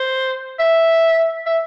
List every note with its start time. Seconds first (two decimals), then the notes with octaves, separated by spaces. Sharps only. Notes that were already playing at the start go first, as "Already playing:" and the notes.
Already playing: C5
0.59 E5
1.46 E5